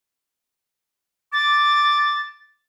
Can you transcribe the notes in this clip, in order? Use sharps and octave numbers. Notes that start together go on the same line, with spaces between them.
D6 A6